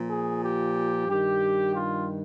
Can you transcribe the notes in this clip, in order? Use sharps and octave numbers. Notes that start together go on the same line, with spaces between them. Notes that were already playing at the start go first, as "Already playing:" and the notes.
Already playing: A#2 F3
G#4
G4
G2 D#3 G4
F4